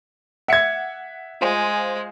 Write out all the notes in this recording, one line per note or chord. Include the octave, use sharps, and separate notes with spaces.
E5 F#5 G#6 C#7
G#3 F4 C5 G#5